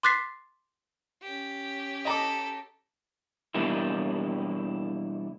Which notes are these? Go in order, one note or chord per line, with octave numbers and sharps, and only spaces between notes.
C6 D6 F#6 A6 B6 C7
C#4 G4
A4 D#5 A#5 D6
B2 E3 G3 A#3 D4 E4